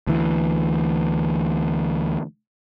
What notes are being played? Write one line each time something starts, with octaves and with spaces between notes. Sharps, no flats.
D2 E3